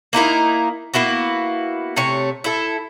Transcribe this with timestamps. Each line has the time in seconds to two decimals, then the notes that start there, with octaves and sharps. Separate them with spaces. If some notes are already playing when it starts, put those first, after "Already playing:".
0.13 A#3 D#4 E4 A#4
0.94 A#3 B3 E4 F#4
1.96 C3 A3 C#5
2.44 E4 A4